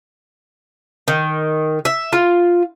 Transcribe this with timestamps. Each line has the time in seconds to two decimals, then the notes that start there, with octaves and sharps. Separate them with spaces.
1.08 D#3
1.85 E5
2.13 F4